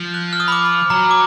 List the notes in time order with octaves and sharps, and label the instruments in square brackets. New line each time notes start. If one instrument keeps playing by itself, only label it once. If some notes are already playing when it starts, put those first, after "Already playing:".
Already playing: [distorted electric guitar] F3
[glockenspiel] F#6
F6
D#6
B5
D6
B5
[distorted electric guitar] F#3 [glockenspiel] A#5
[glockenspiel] D6